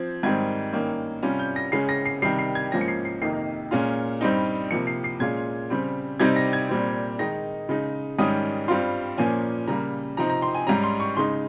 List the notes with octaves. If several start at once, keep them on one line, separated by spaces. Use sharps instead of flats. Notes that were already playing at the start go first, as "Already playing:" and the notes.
Already playing: F3 C4 G#6
G#2 D#3 G3 C4 G#6
G2 D#3 A#3 C#4
C3 G3 C#4 F4
G6
A#6
C#3 G#3 C#4 C7
A#6
C7
C3 D#3 G3 C7
C7
G#6
G#2 F3 A#3 C#4 A#6
C#7
C7
C7
F2 C3 D#3 A#3 D#4 C7
A#2 G#3 C#4 F4
G2 G3 C4 D#4
C3 F3 A#3 C#7
C7
C7
A#2 G#3 C#4 F4 G#6
C#3 G3 C4
C3 G3 C4 D#4 G#6
A#6
G#6
A#2 G3 C4
D#3 G#3 D#4 A#6
C#3 G#3 D#4
G#2 D#3 G3 C#4 D#6
G2 G3 C4 F4 C6
A#2 F3 A#3 C#4 G#5
C#3 G3 A#3 A#5
C3 F3 C4 D#4 A#5
A#5
C6
G#5
G#2 G3 C#4 A#5
C6
C#6
C#3 G#3 D#4 C6